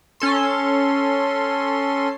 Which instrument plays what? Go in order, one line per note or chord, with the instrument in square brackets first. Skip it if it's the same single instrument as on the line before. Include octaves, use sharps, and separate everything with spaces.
[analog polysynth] C#4 A4 C6